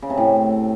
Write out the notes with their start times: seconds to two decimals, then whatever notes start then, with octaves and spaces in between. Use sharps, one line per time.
0.02 C#3
0.10 C3
0.17 A2